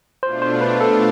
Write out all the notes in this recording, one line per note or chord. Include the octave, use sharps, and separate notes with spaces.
B2 A3 D4 F4 C5
C5
B4
A4